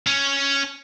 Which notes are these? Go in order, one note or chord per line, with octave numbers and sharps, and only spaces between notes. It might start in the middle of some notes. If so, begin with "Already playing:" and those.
C#4